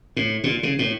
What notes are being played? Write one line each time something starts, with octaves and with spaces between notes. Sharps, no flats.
A2
A#2
C#3
A2